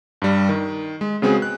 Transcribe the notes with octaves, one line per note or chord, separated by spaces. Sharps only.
G2 G3
D#3
G#3
C#3 G#3 B3 C4 F#4 G#4
F#6